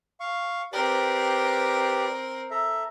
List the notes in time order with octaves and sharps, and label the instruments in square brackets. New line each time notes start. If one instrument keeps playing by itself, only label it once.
[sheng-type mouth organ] F5 C#6
[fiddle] C4 A#4 [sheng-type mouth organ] G4 B4 D5
[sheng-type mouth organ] A4 E5 A#5